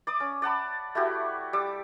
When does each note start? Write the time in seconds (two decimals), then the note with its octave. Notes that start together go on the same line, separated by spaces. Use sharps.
0.07 D5 D6 D#6
0.20 C#4
0.42 D5 F#5 A5 B5
0.95 A3 E4 F#4 G4
1.53 G3 D6 E6